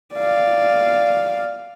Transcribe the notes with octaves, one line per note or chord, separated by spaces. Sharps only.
D5 F5